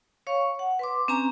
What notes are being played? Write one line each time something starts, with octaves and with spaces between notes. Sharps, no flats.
C#5 F5 C#6
F#5
B4 C6 D6
C4 C#4 G#5 A#5